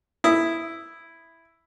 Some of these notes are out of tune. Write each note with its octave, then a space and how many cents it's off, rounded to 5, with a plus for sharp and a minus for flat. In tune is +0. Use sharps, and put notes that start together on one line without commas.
E4 +0 D#6 +0